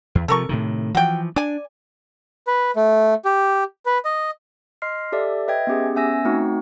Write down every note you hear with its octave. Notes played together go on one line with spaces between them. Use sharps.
E2
C3 F3 A4 A#4 C#6
A2 C3 D#3
E3 F3 F#4 G5
D4 D5 G#5
B4
A3
G4
B4
D#5
D#5 C6 F6 C7
G4 A4 D5 E5
B4 D#5 E5 G5 G#6
B3 C#4 G4 G#4
B3 C#4 E5 G#5 E6 A#6
A3 C4 D#4 F#4 F#5